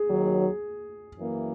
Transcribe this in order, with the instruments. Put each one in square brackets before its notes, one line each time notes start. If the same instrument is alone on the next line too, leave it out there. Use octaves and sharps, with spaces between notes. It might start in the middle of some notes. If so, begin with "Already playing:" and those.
Already playing: [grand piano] G#4
[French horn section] D#2 D#3 F#3
F#2 E3 A#3